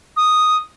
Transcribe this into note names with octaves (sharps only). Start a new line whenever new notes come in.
D#6